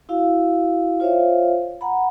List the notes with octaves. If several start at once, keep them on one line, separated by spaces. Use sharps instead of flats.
E4 F#4 F5
F4 C5 C#5 E5 F5
F#5 A#5 B5